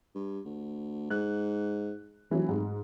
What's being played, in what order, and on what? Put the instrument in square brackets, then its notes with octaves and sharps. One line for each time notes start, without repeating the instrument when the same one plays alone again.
[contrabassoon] G2
D2
[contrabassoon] G#2 [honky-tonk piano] F#6
[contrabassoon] F1 [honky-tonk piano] E3 F#3
[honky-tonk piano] G#2